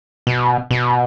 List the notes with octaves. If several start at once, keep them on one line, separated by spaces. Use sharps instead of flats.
B2
B2